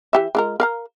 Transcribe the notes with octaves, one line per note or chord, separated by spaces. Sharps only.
E3 G4 E5
G#3 F4 A#4
A#4 F5 A#5